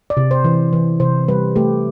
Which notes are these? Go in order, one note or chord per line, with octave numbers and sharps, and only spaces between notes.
D5
C3
C5
E3
E3
C3 C5
G3 B4
A3 G4